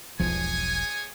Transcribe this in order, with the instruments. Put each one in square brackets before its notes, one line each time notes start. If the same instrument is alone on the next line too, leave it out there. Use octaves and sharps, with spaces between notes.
[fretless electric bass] E1 B1 F3 [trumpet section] G#4 C#5 G#5